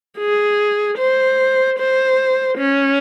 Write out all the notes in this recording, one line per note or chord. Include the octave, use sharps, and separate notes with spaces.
G#4
C5
C5
C#4